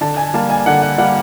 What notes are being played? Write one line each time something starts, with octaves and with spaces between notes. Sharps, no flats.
D3 A5
G#5
G3 A#3 A5
G#5
D3 F#5
F#5
G3 A#3 F#5